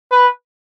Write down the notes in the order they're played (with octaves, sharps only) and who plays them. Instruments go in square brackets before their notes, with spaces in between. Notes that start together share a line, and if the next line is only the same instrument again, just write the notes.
[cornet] B4